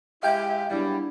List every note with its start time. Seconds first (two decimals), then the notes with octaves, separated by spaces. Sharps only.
0.23 G#3 E4 G4 E5 F5 G5
0.70 G2 F#3 G3 B3 D4 E4 G#4